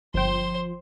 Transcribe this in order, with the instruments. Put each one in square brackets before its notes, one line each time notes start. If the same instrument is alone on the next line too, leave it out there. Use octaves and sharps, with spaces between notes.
[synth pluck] G1 G5 [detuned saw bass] F3 [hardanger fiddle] C5 C6